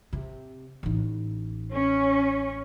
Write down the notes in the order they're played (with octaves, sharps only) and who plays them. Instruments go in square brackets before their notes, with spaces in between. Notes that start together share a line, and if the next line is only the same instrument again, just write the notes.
[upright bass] C3
A1 D#4
[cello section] C#4